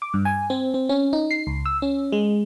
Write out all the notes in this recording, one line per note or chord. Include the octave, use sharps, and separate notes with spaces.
D6
G2
G#5
C4
C4
C#4
D#4
C7
C#2
E6
C#4
G#3